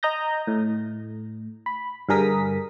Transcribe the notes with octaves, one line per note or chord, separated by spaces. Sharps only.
D#5 A#5 D#6 G6 A#6
A2
B5
G2 D3 G#4 A#4 D#6 B6